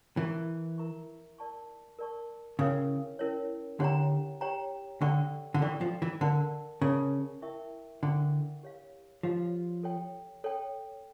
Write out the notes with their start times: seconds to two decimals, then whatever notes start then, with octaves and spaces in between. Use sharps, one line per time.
0.17 E3 E4 A#4 E5 A#5 C#6
0.78 E4 A#4 E5 A#5 C#6
1.39 A#4 D5 A5 C#6
1.99 A#4 D5 A5 C#6
2.59 C#3 C#4 E4 A#4 C#5
3.19 C#4 E4 A#4 C#5
3.80 D3 G4 C#5 G5 A#5
4.41 G4 C#5 G5 A#5
5.01 D3 A4 D5 G5 C#6
5.54 D3
5.61 E3 A4 D5 G5 C#6
5.81 F3
6.02 E3
6.21 D3 A#4 D5 A5
6.82 C#3 A#4 D5 A5
7.42 E4 A#4 E5 G5 C#6
8.03 D3 E4 A#4 E5 G5 C#6
8.63 G4 C#5 F5
9.23 F3 G4 C#5 F5
9.83 A4 C#5 G5
10.44 A4 C#5 G5